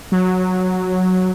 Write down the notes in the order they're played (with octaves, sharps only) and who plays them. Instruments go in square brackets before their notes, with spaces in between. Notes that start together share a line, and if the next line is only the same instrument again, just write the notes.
[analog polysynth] F#3